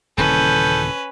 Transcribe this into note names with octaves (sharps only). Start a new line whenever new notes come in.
D#1 C#3 E3 C#4 A4 B4 G6